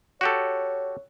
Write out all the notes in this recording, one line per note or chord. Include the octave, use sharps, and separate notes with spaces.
F#4 G4 A4 C#5